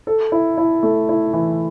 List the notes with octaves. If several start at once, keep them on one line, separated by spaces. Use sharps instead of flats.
A4
E4
E4
A3
E4
E3